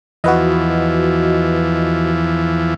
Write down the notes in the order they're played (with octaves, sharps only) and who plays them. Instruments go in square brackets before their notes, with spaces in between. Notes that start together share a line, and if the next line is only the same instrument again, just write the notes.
[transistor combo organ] E2 E3 F3 [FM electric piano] F#4 B4 D#5